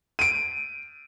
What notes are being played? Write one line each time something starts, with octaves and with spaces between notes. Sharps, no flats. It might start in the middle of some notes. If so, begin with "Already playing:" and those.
D7 D#7